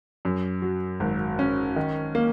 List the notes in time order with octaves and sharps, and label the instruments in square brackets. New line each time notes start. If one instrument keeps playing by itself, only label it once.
[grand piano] F#2
F#3
G#1
C#4
D#3
A#3